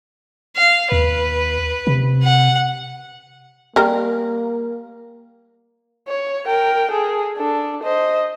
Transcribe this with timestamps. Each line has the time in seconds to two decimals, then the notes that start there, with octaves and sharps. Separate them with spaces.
0.56 F5
0.92 D#2 B4
1.87 C3
2.22 F#5
3.76 G3 A#3 A#4
6.08 C#5
6.47 A#4 G5
6.91 G#4 A4
7.37 D4 A4
7.83 C5 D#5